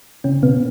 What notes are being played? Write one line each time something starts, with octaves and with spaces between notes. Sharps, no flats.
C#3 C#4
B2 B3